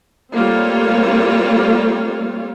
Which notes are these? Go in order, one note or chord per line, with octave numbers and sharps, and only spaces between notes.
G3 A3 A#3 C4 F4 C#5